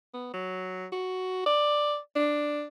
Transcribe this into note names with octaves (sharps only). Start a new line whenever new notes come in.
B3
F#3
F#4
D5
D4